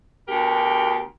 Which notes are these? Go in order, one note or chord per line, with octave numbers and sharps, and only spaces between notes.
D2 B2 G4 A#4